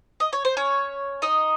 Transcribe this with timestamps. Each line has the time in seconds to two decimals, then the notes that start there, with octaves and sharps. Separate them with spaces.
0.20 D#5
0.33 C#5
0.45 C5
0.57 C#4 C#5
1.22 D#4 D#5